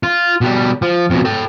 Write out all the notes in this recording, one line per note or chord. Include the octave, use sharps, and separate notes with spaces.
F4
B2 G3
F3
F2 B2
A4 G5